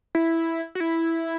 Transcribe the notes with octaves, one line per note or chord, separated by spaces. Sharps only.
E4
F#4
E4